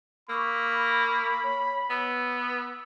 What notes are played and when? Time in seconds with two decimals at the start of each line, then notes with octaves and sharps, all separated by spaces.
0.29 A#3 B5 C#6 D6 E6
1.44 C#5
1.90 B3 E6